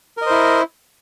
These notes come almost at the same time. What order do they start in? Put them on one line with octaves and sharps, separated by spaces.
A#4 D#5 C5 E4